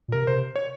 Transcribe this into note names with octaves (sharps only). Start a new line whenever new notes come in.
A#2
C3 A#4
C3 C5
C#5